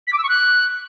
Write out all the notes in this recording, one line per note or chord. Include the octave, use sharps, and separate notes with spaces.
B6
D6
E6
C#6
F#6